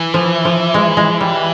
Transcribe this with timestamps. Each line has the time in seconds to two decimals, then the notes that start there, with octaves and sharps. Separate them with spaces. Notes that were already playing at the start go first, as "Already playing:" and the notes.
Already playing: E3
0.14 F3
0.45 F3
0.74 G#3
0.97 G#3
1.21 G3